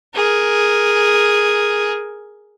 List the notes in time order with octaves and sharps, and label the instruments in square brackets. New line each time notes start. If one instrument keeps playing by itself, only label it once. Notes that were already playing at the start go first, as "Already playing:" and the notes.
[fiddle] G#4 A#4